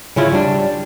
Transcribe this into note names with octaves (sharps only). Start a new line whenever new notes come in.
C#3 C#4 E4 F4
G3 D4